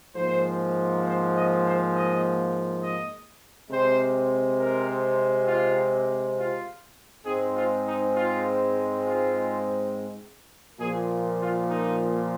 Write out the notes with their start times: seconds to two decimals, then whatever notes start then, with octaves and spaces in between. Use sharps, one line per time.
0.15 G#2 F3 A#3 C5
1.05 C5
1.34 D#5
1.64 C5
1.93 D#5
2.82 D#5
3.70 C3 G#3 C4 C5
4.59 A#4
5.47 F4
6.36 F4
7.25 G#2 G#3 C4 G#4
7.54 F4
7.84 D#4
8.13 F4
9.02 F4
10.79 A#2 F3 A#3 G#4
11.39 F4
11.67 D#4